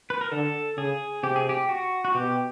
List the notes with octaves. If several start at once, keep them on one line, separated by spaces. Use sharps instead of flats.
B4
A#4
D3 A4
C#3 G#4
C3 G4
G#4
G4
F#4
F#4
B2 G4